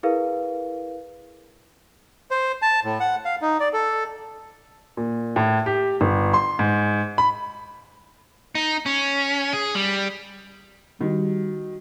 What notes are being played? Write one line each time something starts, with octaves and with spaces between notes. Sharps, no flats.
E4 G#4 A#4 B4 F5
C5
A5
A2
F#5
F5
D#4
D5
A4
A#2
A2
G4
G1
C6
G#2
B5
D#4
C#4
G#4
G3
D#3 G3 F#4